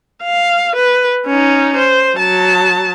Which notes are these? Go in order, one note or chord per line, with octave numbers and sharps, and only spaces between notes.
F5
B4
C#4 D#4
C5
F#3 A5